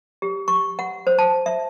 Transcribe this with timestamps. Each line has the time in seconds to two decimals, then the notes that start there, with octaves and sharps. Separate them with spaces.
0.22 G4
0.48 C#6
0.79 F#5
1.07 C5
1.19 A5
1.46 E5